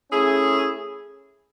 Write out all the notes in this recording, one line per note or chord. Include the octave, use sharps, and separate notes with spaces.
A3 C#4 E4 G#4